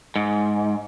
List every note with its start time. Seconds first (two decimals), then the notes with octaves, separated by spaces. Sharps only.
0.16 G#2